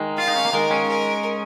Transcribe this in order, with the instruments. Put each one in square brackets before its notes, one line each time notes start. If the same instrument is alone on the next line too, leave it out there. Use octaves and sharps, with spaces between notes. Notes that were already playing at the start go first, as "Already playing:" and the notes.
Already playing: [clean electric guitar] D#3 G#3
[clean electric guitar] F4 [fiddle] F5
[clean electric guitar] D#4
C#4
A#3
[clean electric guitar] D#3 G#3 [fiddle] A#4
[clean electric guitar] G#3 C#4
[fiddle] A#4